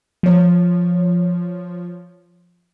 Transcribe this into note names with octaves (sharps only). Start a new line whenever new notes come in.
F3 C#5